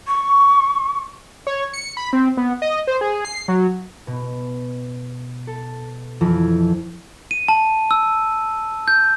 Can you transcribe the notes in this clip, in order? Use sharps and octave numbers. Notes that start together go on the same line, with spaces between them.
C#6
C#5
C#7
B5
C4
B3
D#5
C5
G#4
C7
F#3
B2
A4
F2 E3 F3
D#7
A5
E6
G6